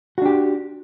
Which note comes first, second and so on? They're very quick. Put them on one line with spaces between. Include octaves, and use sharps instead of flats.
F#4 D4 G4